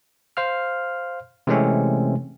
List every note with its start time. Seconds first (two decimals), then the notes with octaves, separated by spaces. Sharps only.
0.37 C5 F5 F6
1.47 C3 E3 G#3 A3 C4 C#4